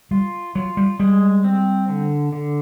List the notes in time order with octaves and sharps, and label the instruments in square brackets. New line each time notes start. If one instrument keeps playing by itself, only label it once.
[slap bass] G3 [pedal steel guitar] F4
[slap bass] F#3 [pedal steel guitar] F4
[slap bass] G3
[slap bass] G3 [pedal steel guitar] G#3
[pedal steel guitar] C4
D3
D3